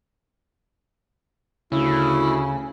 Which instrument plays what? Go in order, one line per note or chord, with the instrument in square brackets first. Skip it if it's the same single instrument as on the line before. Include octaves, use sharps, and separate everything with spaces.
[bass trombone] D2 [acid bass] C#3 [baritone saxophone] E4